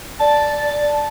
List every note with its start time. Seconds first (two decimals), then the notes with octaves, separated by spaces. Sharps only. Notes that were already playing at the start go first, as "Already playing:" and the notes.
0.20 D5 A5